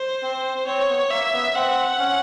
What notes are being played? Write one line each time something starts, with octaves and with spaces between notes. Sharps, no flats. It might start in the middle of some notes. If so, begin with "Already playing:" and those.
Already playing: C5
C4
C4 C#5
B3
A#3 E5
B3
C4 F#5
C#4